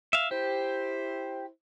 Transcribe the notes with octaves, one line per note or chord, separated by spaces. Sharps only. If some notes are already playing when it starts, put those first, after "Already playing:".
E5 F5
E4 G4 C5